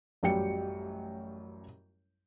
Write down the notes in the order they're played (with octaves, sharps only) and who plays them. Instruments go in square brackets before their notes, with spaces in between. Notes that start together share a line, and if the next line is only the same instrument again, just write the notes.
[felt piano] A1 F#2 F#3 G3 G5 C#7